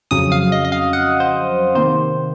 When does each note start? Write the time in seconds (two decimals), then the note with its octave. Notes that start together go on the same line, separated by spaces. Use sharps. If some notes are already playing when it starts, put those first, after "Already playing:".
0.11 F2 C#3 F#3 D#6
0.32 F5
0.52 D#5
0.65 D#5
0.72 F5
0.93 F#5
1.20 C5
1.75 C3 D#3 A#3 C5